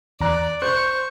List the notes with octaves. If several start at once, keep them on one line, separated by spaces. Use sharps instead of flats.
E2 D5 A#5 F#6
C5 C#6 F#6